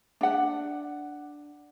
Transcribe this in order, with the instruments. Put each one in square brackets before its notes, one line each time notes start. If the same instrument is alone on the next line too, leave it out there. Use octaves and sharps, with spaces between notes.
[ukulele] D4 F#5